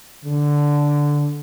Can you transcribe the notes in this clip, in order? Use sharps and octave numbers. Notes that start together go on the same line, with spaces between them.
D3